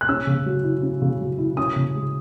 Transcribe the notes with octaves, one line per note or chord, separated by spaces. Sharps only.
F#6
C#4 E6
C#3
F#3
E4
C#4
C#3
F#3
E4
C#4 D#6
C#3
G#3